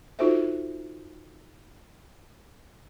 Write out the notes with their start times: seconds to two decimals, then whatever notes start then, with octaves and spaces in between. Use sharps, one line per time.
0.19 D#4 F4 F#4 A4 C5 E5